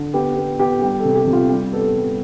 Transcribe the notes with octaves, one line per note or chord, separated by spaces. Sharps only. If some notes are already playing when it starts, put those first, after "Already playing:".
Already playing: D3
B3 G4
B3
B3 G4
G3 G4
A4
C3
G4
C3
F4
G3 G4
B3 A4
G3